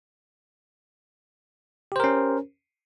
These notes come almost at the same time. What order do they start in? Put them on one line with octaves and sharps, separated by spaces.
G4 C5 A#4 C#4